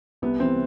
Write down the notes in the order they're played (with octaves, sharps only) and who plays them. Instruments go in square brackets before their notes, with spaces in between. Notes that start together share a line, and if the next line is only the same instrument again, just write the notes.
[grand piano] C2 B3
E3 C4